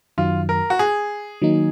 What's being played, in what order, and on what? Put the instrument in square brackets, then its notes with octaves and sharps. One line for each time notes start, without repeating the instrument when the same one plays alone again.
[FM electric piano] F#2 D#3 F#3 [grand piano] F4
[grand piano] A#4
F#4
G#4
[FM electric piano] D#3 F#3 A#3 D#4